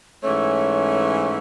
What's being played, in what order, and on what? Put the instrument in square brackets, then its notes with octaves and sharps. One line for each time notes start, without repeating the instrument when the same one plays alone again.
[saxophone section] G#2 E3 A3 C#4 [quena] C#5